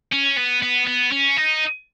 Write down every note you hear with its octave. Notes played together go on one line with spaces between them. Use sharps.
C#4
B3
B3
B3
C#4
D#4